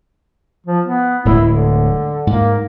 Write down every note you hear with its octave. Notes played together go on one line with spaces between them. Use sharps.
F3
B3
D1 A2 G#3 E4
D3
G#2 A#3